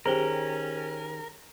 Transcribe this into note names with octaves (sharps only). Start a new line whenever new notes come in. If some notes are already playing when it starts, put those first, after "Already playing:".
D#3 C#4 G4 G#4 A#4 C5 G7